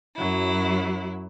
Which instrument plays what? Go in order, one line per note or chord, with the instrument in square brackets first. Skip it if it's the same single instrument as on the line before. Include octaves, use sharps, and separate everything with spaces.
[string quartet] F#2 F#3 E4